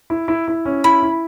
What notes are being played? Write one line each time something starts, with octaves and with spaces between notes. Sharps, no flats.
E4
E4
E4
C#4
E4 B5
E4